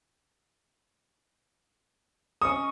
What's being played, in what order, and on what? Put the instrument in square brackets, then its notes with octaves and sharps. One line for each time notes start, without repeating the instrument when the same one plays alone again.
[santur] C#4 D#5 C#6 [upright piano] D#6